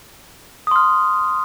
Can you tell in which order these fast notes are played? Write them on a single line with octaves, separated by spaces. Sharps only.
D#6 C6 F6